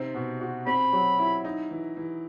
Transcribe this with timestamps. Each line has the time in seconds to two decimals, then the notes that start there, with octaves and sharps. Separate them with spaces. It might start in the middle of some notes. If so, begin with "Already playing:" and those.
Already playing: C3 C4 D#4
0.15 B2
0.40 F#4
0.67 C4 B5
0.92 F#3
1.19 E4
1.44 D#4
1.71 E3
1.97 E3